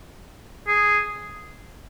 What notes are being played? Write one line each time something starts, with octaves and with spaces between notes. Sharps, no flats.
G#4